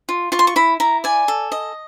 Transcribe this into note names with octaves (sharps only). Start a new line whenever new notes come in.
F4
F4 C#6
C6
C#6
E4 B5
E4 A#5
D5 G#5
A4
D#5